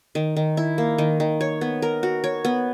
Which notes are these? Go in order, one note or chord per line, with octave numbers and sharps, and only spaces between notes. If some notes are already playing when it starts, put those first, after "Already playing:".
D#3
D#3
E4
A#3
D#3
D#3
C#5
B3
A#4
F#4
C#5
B3